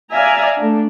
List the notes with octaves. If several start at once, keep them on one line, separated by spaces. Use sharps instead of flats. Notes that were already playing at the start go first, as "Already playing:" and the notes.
D5 E5 F5 G#5 A#5
A3 D4